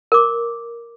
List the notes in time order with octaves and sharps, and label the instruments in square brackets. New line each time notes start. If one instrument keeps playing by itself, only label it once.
[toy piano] A#4 D6